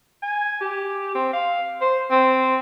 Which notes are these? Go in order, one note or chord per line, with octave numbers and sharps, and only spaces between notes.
G#5
G4
C4
F5
C5
C4